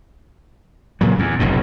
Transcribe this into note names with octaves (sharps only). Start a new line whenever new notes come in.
A#2 C#3 F#3
E2
F1 B1 F#2 A2